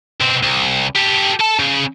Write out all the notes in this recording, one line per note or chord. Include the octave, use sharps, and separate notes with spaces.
B2 C4
C2
G4 A4
A4 A5
C#3